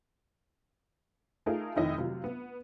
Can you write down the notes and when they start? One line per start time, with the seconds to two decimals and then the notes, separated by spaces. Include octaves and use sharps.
1.46 A3 D#4 F4 G#4 A#4
1.76 F1 D#3 D#4 E4 D#5
1.98 C3 F#3 F4
2.24 B3